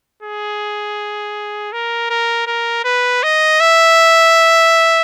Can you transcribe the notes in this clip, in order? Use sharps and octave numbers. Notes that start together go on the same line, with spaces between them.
G#4
A#4
A#4
A#4
B4
D#5
E5